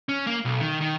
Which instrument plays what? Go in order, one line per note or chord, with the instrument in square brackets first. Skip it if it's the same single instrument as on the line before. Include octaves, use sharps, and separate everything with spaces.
[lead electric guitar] C#4
A#3
B1
D#3
D#3